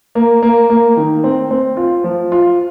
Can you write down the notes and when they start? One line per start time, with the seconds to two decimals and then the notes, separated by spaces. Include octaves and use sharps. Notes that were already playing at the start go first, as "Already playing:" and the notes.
0.15 A#3
0.42 A#3
0.70 A#3
0.97 D#3
1.24 C4
1.51 C4
1.77 F4
2.04 F3
2.32 F4